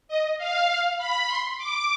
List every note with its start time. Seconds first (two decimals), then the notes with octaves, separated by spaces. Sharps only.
0.08 D#5
0.38 F5
0.68 F5
0.98 B5
1.27 C6
1.57 D6